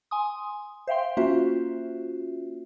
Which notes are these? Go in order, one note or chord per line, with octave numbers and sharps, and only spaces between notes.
G#5 C6 D#6
C5 E5 F5 G5 C6
A#3 C#4 F4 F#4 C5 E5